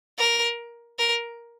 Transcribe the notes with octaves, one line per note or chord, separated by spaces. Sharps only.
A#4
A#4